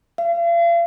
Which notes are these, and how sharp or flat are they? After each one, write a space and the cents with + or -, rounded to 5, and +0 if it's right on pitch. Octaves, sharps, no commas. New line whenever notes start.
F5 -40